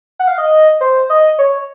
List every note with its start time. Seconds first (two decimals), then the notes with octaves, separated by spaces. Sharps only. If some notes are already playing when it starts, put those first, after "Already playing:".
0.19 F#5
0.28 F5
0.38 D#5
0.81 C5
1.10 D#5
1.39 C#5